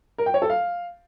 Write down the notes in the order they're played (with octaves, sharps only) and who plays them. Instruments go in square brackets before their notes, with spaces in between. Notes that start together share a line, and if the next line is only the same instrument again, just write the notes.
[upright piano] A#4
G5
C#5
A4
F5